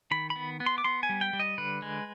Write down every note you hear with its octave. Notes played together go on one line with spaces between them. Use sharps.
D#3 B5
B5
B3
B3
C6
D6
B3 C6
G#5
G3
G5
G3
D#5
D3 B4
G#3